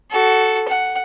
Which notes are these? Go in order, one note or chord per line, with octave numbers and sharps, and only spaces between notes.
F#4 A4
F#5